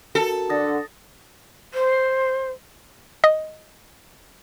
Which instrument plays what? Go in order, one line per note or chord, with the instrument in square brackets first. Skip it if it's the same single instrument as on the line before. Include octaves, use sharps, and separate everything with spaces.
[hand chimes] F#4 A#4 [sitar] A4
[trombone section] D3 [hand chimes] D#6 A6 A#6
[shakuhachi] C5
[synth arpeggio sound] D#5